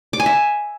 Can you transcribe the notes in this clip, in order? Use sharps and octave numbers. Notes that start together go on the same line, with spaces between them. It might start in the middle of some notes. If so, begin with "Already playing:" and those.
D6
G#5
E5